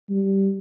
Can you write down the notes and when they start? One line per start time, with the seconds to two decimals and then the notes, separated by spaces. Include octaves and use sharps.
0.10 G3